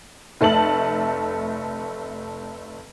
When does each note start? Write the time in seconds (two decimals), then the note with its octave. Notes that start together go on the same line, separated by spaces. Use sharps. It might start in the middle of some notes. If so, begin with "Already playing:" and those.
0.41 F1 A3 A5 F#7